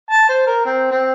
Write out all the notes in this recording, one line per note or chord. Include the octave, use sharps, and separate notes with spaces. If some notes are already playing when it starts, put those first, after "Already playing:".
A5
C5
A#4
C4
C4